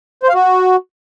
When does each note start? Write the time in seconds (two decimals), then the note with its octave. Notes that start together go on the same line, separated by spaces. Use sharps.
0.23 C5
0.29 F5
0.35 F#4